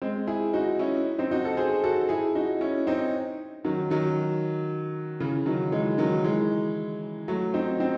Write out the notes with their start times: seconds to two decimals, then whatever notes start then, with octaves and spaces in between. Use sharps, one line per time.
0.02 G#3 C4
0.27 E4 G#4
0.53 D#4 F#4
0.79 C#4 E4
1.19 C4 D#4
1.31 D#4 F#4
1.45 F#4 A4
1.57 G#4 C5
1.84 F#4 A4
2.09 E4 G#4
2.35 D#4 F#4
2.61 C#4 E4
2.87 C4 D#4
3.65 D#3 F#3
3.90 D#3 F#3
5.20 C#3 E3
5.46 D#3 F#3
5.72 E3 G#3
5.98 D#3 F#3
6.24 E3 G#3
7.28 F#3 A3
7.54 C4 D#4
7.80 C4 D#4